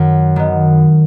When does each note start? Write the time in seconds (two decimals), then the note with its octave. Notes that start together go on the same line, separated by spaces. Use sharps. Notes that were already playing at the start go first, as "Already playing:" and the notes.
Already playing: F#2 D#3 B3
0.36 D#3 B3